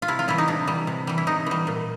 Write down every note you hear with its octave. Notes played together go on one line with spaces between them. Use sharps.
F4
C3 E4
F4
E3 G3 E4
D#4
C3 D4
E3 G3
C3
E3 G3
E4
C3 D#4
E3 G3
A#2